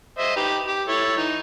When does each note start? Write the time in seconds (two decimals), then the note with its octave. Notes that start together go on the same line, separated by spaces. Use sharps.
0.18 C5 D#5 E5
0.36 D#4 G4 B4
0.67 G4
0.88 E4 A4 C#5
1.17 E3 D#4